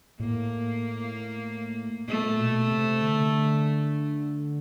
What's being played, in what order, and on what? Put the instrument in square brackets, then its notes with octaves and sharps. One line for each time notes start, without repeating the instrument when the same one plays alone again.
[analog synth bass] A2 [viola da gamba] A#3
[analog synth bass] A#2 [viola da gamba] A3
[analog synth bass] B2
C3
D3